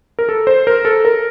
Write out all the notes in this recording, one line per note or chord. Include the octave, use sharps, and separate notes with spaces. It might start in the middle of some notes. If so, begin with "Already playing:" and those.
A#4
A4
C5
A#4
A4
A#4